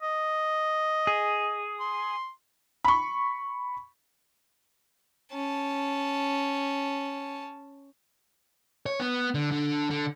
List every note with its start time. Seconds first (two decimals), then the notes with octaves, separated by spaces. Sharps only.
0.02 D#5
1.07 G#4
1.80 C6
2.85 B5 C#6
5.33 C#4 A5
8.86 C#5
9.00 B3
9.34 D3
9.51 D3
9.90 D3